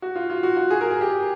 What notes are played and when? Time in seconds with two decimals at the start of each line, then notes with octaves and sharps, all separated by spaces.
0.02 F#4
0.16 F4
0.30 F4
0.43 F#4
0.57 F#4
0.71 G#4
0.81 A#4
0.91 G#4
1.01 G4